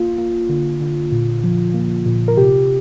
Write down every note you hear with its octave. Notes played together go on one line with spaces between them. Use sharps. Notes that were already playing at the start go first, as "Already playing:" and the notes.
Already playing: A#3 F4
A#3
D3
D3
A#2
F3
A#3
A#2
A#4
C3 G4